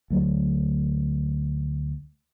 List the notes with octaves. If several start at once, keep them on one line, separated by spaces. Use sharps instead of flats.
D2 F#3 A3